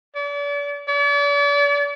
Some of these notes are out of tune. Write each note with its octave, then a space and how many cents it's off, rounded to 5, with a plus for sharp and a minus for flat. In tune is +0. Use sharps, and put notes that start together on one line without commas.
D5 -40
D5 -40